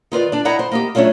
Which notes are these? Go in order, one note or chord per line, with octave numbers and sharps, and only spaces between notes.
D#3 F4 B4 D5
D4 D5
D#4 E4 D5 F#5 A#5
C5
A#3 D#4 G4
F#3 A3 C#4 D4 F4